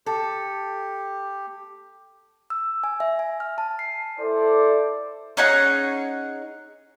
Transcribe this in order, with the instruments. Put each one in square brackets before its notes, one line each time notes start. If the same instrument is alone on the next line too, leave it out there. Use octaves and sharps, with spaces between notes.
[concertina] G4 [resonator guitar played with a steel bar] A4
[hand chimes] E6
G#5
E5
G#5
F6
A5
C7
[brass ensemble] E4 A4 C5 D5
[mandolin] C#4 D#4 G#4 F#5